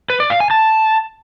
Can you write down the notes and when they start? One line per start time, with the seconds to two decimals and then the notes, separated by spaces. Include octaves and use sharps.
0.10 B4
0.20 D5
0.30 F5
0.40 G#5
0.51 A5